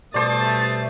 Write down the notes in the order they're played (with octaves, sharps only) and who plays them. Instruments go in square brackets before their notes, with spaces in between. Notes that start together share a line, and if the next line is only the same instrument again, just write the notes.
[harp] B2 A5 [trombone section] G3 A3 [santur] C5 D5 [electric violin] D#6 A6